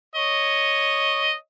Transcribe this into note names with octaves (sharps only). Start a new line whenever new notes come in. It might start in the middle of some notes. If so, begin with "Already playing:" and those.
C#5 D#5